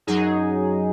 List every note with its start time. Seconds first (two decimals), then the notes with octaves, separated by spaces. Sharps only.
0.07 F#2 F#3 D#4 G#4